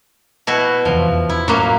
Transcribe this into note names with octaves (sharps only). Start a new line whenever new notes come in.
B2 E4 F#4
F1 E2 F3
E4
F#2 A2 F#3 A#3